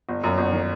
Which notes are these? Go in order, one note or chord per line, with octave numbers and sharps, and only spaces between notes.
G1
F#2
G1
D#3